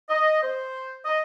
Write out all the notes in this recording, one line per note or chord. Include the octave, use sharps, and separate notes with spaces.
D#5
C5
D#5